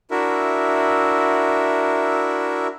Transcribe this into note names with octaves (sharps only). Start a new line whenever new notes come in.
D4 E4 F#4 A#4 E5